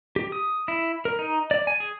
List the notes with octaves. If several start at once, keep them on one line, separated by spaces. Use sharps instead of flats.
G4
D#6
E4
A#4
D#4
D5
G#5
G#4